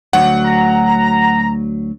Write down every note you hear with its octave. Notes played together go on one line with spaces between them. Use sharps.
D2 F#3 F#5
A#5